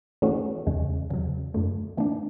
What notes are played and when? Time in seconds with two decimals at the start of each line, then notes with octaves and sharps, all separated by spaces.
0.22 E3 A3 C#4 F#4
0.67 E2 C#3 G#3
1.11 E2 C#3 F#3
1.54 F#2 D3 A3
1.97 E3 A3 D4